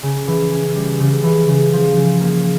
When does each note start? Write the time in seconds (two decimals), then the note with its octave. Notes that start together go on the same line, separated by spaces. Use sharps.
0.03 C#3
0.28 E3
0.51 C#4
0.76 G3
1.00 C#3
1.24 E3
1.48 C#3
1.73 F3
1.96 C#3
2.21 A#3